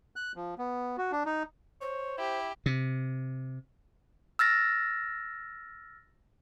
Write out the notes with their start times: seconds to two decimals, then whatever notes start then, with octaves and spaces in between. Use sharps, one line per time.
0.16 F#6
0.36 F3
0.58 B3
0.98 F#4
1.12 D4
1.26 D#4
1.81 C5 C#5
2.18 E4 G4
2.66 C3
4.39 E6 F6 A6 A#6